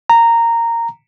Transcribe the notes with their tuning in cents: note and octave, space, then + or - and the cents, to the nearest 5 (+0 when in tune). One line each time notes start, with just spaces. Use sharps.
A#5 -10